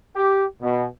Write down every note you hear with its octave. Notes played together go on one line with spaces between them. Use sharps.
G4
B2